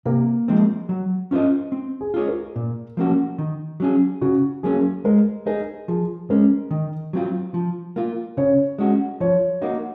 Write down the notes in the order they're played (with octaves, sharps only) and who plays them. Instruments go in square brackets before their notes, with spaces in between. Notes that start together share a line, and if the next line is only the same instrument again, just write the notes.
[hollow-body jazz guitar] C3 [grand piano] A#3
[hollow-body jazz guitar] F3 G#3 C4
F#3
C#4 F4 C5 D#5
C4
[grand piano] G#4
[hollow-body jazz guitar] F4 G#4 C#5
[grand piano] A#4
[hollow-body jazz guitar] A#2
F3 A#3 C#4 F#4
D#3
F#3 C#4 G#4
[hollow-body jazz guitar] C#3 [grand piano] F#4
[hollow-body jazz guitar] F#3 A#3 C#4 [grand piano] G#4
[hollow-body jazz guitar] G#3 [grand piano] A#4
[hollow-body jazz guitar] D#4 G#4 [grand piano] A#4
[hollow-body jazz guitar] F3 [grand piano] G#4
[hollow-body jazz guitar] G#3 C#4 [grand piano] A#4
[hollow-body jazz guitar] D#3
F#3 C4 F4
F3
A#3 F4
[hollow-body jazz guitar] C#3 [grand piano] C#5
[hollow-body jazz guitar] G#3 C#4 F#4
[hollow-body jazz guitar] F3 [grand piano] C#5
[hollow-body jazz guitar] A#3 D#4 F#4